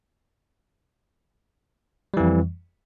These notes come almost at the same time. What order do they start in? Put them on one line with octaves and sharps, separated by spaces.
G3 E3 F2